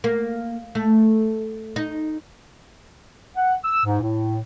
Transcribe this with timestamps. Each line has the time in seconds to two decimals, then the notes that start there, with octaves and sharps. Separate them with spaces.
0.04 A#3
0.75 A3
1.76 D#4
3.37 F#5
3.65 E6
3.85 G#2
4.01 A2